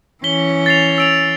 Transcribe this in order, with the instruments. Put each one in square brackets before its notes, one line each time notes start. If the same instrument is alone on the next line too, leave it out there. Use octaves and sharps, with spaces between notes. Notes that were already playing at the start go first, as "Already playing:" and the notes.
[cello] E3 C#4 [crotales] B6 G7
[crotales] A6 C7 F7
E6 D7 F7